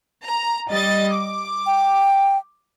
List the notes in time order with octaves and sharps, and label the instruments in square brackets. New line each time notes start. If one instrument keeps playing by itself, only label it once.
[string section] A#5
G3 D#5 A6
D6
[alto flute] G5